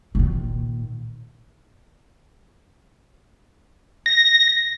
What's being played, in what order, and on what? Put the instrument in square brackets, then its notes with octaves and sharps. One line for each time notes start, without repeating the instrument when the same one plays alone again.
[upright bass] A#2 D#3
[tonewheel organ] A#6